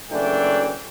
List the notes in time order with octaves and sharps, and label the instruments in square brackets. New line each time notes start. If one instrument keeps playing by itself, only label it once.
[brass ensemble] F#1 E3 F#3 A3 D4 G5